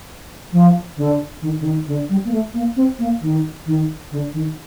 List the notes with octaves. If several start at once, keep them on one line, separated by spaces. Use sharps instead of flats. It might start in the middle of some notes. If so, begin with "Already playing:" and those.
F3
D3
D#3
D3
D#3
D3
G3
A#3
A3
A#3
C4
A#3
D#3
D#3
D3
D#3